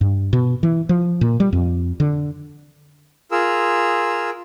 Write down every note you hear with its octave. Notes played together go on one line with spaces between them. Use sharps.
G2
B2
E3
F3
A#2
G3
F2
D3
F4 G#4 A#4 E6